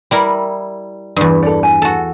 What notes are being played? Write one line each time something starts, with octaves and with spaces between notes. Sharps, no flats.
G3 E4 A#4
E2 G2
A4 D5
G#5
F#4 A4